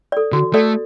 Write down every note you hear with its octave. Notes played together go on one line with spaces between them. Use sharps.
A4 D5
D3 F#4
A3 A4 D5